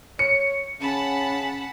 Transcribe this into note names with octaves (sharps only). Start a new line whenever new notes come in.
C#5 C#7
C#3 C#4 F#5 A5 B5